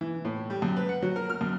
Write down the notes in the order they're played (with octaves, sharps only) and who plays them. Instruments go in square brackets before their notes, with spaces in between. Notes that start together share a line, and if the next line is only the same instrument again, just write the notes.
[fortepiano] E3
A2
G3
F#2
B4
F#5
F#3
A#4
F6
F#2